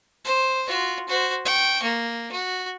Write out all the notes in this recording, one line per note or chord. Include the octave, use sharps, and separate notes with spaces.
C5
F4 F#4
F#4 C5
G5 C#6
A#3
F#4